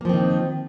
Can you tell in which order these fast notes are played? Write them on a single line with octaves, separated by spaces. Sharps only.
A#3 F3 C4 D#3